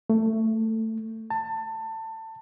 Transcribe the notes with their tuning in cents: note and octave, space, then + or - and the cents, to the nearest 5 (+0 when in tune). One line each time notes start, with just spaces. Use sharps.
A3 +15
A5 +25